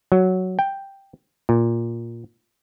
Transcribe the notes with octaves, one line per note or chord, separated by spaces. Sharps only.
F#3
G5
A#2